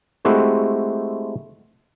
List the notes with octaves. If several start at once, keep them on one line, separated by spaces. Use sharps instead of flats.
G#3 A3 C4 E4 F#4 G4